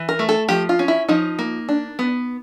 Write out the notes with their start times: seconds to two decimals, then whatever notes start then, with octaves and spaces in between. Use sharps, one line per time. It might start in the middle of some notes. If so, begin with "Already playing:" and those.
Already playing: E3
0.09 A#4
0.19 A3
0.29 A4
0.49 F3 G4
0.69 F4
0.79 C#4
0.88 E4
1.08 F3 D#4
1.39 A#3
1.69 D4
1.99 B3